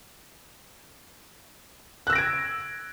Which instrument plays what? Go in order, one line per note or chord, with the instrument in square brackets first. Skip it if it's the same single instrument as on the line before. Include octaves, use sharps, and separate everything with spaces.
[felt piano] F#6
E6
A#6
D7
G#6